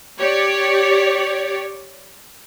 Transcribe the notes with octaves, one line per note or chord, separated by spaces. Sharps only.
G4 C#5 D5